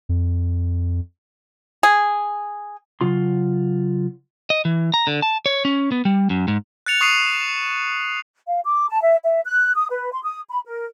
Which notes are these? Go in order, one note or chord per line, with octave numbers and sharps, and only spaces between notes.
F2
G#4
C#3 F#3 F4 C6
D#5
E3
A#5
D3
A5
C#5
C#4
B3
G3
F#2
G#2
F#6 A6 C#7 F7
C#6 D#6 F#6 C7 D#7 E7
F5
D6
A5
E5
E5
F#6
D#6
B4
C6
D#6
B5
A#4